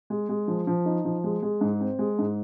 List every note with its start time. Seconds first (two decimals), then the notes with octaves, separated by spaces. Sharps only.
0.10 G#3
0.29 G#3
0.48 F3
0.67 F3
0.85 D#4
1.05 F3
1.24 G#3
1.42 G#3
1.61 G#2
1.80 C4
1.99 G#3
2.19 G#2